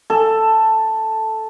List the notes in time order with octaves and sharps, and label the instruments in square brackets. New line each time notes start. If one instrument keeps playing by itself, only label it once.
[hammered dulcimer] A4